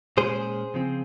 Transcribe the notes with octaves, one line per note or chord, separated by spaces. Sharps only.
A#2 G#3 C#4 G#4 C5
C#3 F3 C4